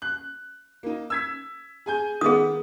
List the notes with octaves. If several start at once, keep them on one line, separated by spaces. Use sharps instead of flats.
F#6
A#3 D#4
E6 G#6 B6
G#4 G#5 G6
D#3 B3 G#4 D#6